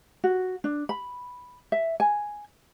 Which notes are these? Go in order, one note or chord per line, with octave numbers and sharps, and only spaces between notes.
F#4
D4
B5
E5
G#5